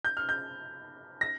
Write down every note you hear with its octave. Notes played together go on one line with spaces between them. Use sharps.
G6
F6
G6
A#6